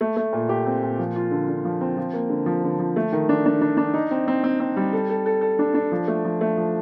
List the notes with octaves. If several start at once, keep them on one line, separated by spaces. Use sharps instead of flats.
A3
A3
A#2
G4
C4
A#2
F3
F4
D3
D3
F3
C4
F3
A#3
D3
F3
D3
F3
A3
D#3
D4
D4
D4
D4
D#4
C4
C4
C4
C4
G3
A4
A4
A4
A4
D4
D4
F3
A3
F3
A3
F3